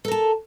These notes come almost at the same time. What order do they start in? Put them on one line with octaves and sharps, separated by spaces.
A4 A#4 A5